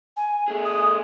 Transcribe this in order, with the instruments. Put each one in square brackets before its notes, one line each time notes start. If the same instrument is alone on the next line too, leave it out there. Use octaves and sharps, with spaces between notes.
[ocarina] G#5
[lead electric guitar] A3 G#4
[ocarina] D#6